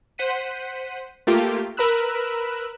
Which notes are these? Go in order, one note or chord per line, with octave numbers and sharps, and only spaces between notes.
C5 F#5 B6 D#7
A3 A#3 F4 G4
A#4 B4 B5 E6 F#6